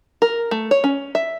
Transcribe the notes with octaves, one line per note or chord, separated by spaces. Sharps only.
A#4
A3
C#5
C#4
E5